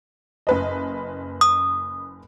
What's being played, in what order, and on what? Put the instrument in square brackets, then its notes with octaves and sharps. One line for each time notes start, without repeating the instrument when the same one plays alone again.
[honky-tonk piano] F#1 B4 D#5
[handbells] D#6